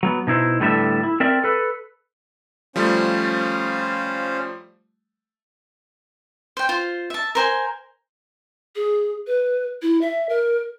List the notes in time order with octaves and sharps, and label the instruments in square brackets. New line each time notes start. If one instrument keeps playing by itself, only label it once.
[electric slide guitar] F#3 A#3 B3
B2 D#4 E4 C5
A2 D3 G3 B3 A4 E5
E4
C4 A#4 D5 E5
A4 B4
[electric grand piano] F3 G3 A3 [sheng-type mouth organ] C#4 C5 F5
[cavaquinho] C5 G5
F4 C5
E5 A5
A#4 C5 G#5
[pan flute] G#4
B4
E4
E5
A#4